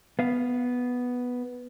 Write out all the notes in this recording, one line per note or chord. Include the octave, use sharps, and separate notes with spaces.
B3 F5